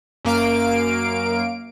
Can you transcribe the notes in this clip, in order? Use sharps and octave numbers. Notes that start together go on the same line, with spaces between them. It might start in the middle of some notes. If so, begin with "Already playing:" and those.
F#2 A#3 F5 D7